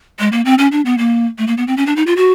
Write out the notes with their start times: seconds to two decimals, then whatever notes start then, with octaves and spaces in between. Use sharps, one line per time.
0.19 G#3
0.32 A#3
0.45 C4
0.58 C#4
0.72 D4
0.86 B3
0.98 A#3
1.38 A3
1.47 A#3
1.57 B3
1.67 C4
1.77 C#4
1.87 D4
1.96 D#4
2.07 F4
2.17 F#4